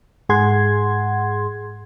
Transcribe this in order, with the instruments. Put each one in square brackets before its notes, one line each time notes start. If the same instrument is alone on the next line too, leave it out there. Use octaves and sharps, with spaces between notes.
[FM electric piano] G#2 G#4 F#5 C6 G#6